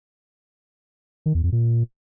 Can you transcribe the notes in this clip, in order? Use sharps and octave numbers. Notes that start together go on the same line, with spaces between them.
D#3
E2
F2
A#2